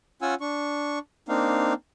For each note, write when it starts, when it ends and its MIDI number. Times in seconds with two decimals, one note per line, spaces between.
0.22 0.35 61
0.22 0.35 65
0.22 0.35 78
0.22 0.35 80
0.22 0.35 88
0.41 0.99 62
0.41 0.99 85
1.29 1.74 58
1.29 1.74 60
1.29 1.74 62
1.29 1.74 63
1.29 1.74 77